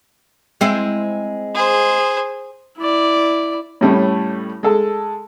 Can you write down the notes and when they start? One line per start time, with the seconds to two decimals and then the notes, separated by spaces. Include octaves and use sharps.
0.61 G#3 C4 E4
1.54 G#4 C5
2.78 E4 D5
3.81 A2 G3 A3 C#4
4.63 G#3 A4